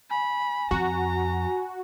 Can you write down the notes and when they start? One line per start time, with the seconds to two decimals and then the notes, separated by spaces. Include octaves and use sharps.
0.10 G#5 B5
0.71 F2 F#4 A#5